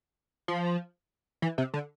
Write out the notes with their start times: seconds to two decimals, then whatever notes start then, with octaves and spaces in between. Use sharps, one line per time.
0.48 F3
1.42 E3
1.58 C3
1.74 D3